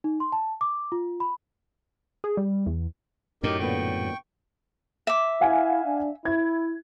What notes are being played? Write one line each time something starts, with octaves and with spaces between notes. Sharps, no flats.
D#4
C6
A5
D6
F4
B5
G#4
G3
E2
F#2 A2 D#4 G4 A#4
A#2 D3 B3 G5 C#6
E5 D6
E4 F5 F#5 G#5
D4
E4 G#6